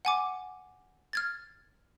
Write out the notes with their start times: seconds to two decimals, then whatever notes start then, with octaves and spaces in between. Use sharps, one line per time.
0.05 F#5 G#5 D6
1.13 F6 G#6 A6